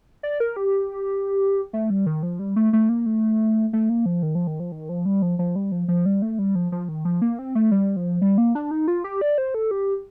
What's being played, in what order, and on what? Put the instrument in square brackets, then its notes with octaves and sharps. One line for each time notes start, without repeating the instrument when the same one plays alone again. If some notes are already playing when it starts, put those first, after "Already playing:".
[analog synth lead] D5
A#4
G4
A3
G3
D#3
F3
G3
A3
A3
A#3
A3
A3
A#3
F3
D#3
F3
D#3
F3
D#3
F3
G3
F3
F3
G3
F3
F3
G3
A3
G3
F3
F3
D#3
F3
A#3
C4
A3
G3
F3
G3
A#3
D4
D#4
F4
G4
D5
C5
A4
G4